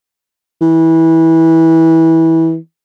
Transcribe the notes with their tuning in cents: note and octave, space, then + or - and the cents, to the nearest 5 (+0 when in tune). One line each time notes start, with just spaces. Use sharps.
E3 -20